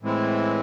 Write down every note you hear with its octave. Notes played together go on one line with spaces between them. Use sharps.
A2 E3 G#3 C4 E4